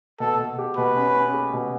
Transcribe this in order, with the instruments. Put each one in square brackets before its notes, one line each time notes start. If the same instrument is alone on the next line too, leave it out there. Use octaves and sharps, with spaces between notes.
[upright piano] B2 [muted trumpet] A4
[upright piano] B2
G4
[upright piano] B2 [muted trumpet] B4
[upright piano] C#4
C#4
G4
B2